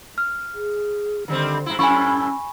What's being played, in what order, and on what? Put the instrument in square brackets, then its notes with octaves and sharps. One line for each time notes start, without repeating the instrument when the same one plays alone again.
[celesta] F6
[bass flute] G#4
[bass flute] D3 [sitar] D#3 G3 C4
[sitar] G2 E4
[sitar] F#2 A2 E4 [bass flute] C#4 [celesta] G#5 B5 C#6